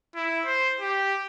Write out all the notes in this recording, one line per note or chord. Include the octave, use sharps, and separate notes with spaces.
E4
C5
G4